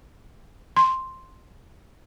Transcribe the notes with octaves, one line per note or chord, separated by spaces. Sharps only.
C6